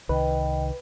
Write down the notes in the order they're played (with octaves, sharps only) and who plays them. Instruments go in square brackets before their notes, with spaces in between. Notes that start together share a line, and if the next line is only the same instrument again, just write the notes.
[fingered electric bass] C2 D#3 [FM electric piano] B4 [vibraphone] D#5 G5